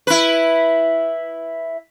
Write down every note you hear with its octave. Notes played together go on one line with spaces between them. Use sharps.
E4 B4